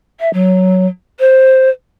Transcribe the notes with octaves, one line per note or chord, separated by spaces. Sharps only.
E5
F#3
C5